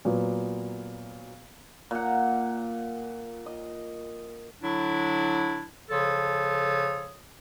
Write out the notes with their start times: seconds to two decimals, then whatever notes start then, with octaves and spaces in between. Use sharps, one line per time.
0.05 A#2 F#3 B3
1.91 A#2 F#5
3.46 D#5
4.62 D3 F#3 D4 E4
5.90 C#3 F3 A4 C#5 D#6